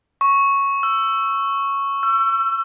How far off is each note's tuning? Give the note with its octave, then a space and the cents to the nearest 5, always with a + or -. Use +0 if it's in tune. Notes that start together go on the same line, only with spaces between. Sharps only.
C#6 -5
E6 +15
E6 +35